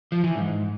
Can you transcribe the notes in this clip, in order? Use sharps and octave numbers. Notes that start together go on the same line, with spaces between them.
F3
E3
G#2